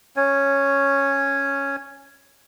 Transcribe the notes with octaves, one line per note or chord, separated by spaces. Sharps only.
C#4 C#5